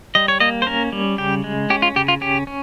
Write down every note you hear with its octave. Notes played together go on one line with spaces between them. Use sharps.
G3 D#5
C#5
A#3 D#5
C5
C#4 A#4
G3
C#3 G4
G#3
C#4 G4
F4
C#3 G4
F4
C#4 G4
C#4